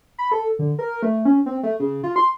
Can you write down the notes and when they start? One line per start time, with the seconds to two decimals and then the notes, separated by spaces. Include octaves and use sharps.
0.18 B5
0.32 A4
0.59 D3
0.79 A#4
1.03 A3
1.25 C#4
1.46 C4
1.63 A3
1.80 C#3
2.04 F4
2.16 C6